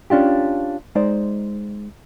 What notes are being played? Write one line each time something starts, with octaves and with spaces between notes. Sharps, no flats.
C#4 D4 F4 G4
G#3 D#4 C5 D5